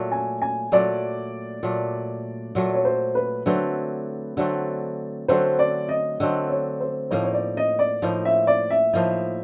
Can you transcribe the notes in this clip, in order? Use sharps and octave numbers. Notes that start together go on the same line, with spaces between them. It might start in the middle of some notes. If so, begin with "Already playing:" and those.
Already playing: A#2 F#3 A3
G#5
G#5
A#2 F#3 A3 D5
A#2 F#3 A3
A#2 F#3 A3
C#5
C5
B4
D3 F#3 A3 C4 B4
D3 F#3 A3 C4
D3 F#3 A3 C4 C5
D5
D#5
D3 F#3 A3 C4 D#5
C#5
C5
A2 F3 A#3 D#4 C#5
C#5
D5
D#5
D5
A2 F3 A#3 D#4
E5
D5
E5
A2 F3 A#3 D#4